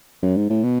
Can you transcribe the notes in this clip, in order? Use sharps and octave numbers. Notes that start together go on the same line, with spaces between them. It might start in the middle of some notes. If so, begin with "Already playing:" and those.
F#2
G#2
A2
B2